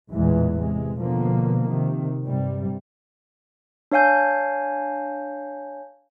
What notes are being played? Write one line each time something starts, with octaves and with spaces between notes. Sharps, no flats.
A1 E2 A#2 E3 G#3
C3 G#3
B2 D3 F3 A#3
C3 D#3
G2 C3 G3
D4 C#5 F5 G#5 G6